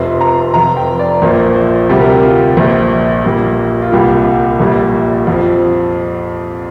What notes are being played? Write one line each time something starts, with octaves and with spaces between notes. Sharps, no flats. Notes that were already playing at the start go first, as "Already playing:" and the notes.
Already playing: F1 F2 C3 F3 C6
A#5
F1 F2 F3 A#5
G5
D5
A#1 A#2 F3 A#4
C5
D2 C3 G3 G4
A#4
G4
F4
A#1 A#2 F3
A#1 A#2 G3
F4
C2 A#2 G3 G4
A#1 A#2 G3
F2
F3